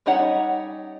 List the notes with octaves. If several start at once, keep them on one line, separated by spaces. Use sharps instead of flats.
G3 C#4 D#4 C#5 F#5